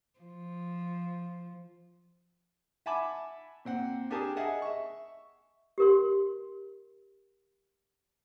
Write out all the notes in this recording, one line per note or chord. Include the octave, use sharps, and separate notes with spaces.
F3
E5 F#5 G#5 A5 B5 D6
A#2 C4 F#5
D4 G4 G#4 A#4 G#5 A5
G#4 D#5 E5 F#5 A5
E5 C#6
G4 A#4 C6